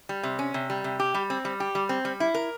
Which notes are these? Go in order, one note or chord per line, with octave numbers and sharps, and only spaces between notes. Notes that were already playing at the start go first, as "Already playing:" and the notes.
G3
C3
C#4
C3
G3
C3
G4
G3
C4
G3
G4
G3
C4
G3
E4
A#4